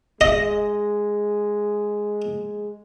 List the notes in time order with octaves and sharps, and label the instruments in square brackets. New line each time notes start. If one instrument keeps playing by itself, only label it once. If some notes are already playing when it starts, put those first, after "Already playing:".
[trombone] G#3 [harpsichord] D#5